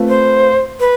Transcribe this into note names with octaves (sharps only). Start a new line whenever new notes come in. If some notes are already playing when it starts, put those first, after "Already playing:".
Already playing: A3 C4 F4 B4
C5
B4